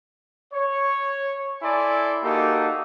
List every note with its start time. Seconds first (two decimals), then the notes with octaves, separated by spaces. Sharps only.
0.53 C#5
1.63 E4 A4 D5 G#5 C6
2.24 A#3 D#4 F#4 G4 A4